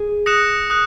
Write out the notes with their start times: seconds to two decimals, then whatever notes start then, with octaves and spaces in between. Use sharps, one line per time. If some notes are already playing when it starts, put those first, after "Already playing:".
Already playing: G#4
0.26 D#6 F#6 A#6 C#7 E7
0.70 A#4 D#6 F#6